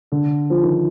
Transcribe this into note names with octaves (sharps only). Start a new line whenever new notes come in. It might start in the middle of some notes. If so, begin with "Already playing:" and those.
D3
F3
D#3